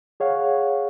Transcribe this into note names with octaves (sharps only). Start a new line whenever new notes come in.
G#4 C#5 F5 F#5